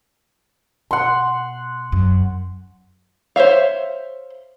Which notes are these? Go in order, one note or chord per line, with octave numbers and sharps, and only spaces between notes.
B2 F#5 C6
F#2
C5 C#5 E5 F5